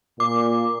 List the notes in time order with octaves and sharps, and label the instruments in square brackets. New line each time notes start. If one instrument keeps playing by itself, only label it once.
[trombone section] A#2 [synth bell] D6